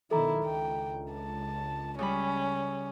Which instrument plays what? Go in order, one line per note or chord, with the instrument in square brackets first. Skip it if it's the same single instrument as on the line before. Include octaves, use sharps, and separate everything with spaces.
[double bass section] B1 D#3 [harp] D4 [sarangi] E4 [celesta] A4 A#5
[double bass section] C#2 [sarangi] G5
[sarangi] A5
[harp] C#3 G3 B5 [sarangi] C#4